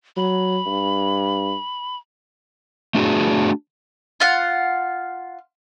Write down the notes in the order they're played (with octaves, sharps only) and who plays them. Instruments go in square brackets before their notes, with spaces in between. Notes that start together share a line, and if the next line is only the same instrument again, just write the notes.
[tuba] F#3 [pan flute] B5
[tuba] G2
[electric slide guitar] A3 D4 F#4 G#4
[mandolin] F4 F5 F#5